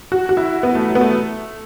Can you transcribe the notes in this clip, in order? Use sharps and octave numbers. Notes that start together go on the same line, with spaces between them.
F#4
F#4
E4
B3
A3
F#3
B3
A3